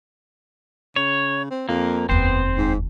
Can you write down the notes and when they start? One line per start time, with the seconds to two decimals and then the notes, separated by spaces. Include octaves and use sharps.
0.96 C#3 C#5
1.51 C4
1.69 F2 A#3
2.09 F1 D#2 B3 C4 C5
2.58 G#2